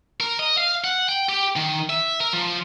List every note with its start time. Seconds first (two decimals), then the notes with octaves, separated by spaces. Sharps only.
0.20 A#4
0.39 D#5
0.57 F5
0.84 F#5
1.09 G5
1.29 G4
1.56 D#3
1.90 E5
2.20 A#4
2.33 F3